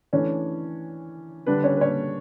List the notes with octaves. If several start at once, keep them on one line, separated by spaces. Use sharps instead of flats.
E3 A3 C#4 D4 C#5
D3 G3 D4 B4
C#4 C#5
B4
C#4 C#5